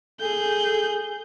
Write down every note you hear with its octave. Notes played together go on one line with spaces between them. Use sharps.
G#4 A4 G6